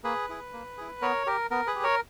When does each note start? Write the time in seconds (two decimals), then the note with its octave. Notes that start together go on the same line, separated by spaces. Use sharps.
0.04 A#3 G#4 B4
0.29 E4 G#4
0.53 A#3
0.78 E4 G#4
1.01 B3 A#4 C#5
1.26 G4 A#4
1.51 B3 A#4
1.67 G#4 B4
1.76 G4
1.83 A#4 C#5